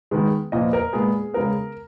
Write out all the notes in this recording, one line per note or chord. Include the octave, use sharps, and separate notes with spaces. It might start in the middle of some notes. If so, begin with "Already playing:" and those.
D#3 G#3 B3
A#2 F3 B3 D#5
A#4
A#2 G#3 B3 G#4
C#3 G#3 B3 A#4